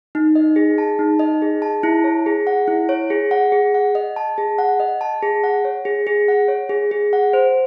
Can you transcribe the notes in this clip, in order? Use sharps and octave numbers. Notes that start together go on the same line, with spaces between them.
D#4
D#5
G#4
A5
D#4
D#5
G#4
A5
E4
C#5
G#4
F#5
E4
C#5
G#4
F#5
G#4
F#5
D#5
A5
G#4
F#5
D#5
A5
G#4
F#5
C#5
G#4
G#4
F#5
C#5
G#4
G#4
F#5
C5